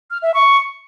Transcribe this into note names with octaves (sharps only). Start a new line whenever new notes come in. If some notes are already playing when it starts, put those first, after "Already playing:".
F6
E5
C#6